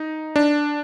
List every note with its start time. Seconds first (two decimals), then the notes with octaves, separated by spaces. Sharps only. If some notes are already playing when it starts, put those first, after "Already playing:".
Already playing: D#4
0.36 D4